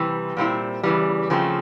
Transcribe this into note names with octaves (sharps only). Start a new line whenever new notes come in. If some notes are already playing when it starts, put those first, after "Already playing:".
Already playing: C3 E3 G3
A#2 G3 C4 E4
E2 C#3 E3 G3
C#3 F3 A3 C4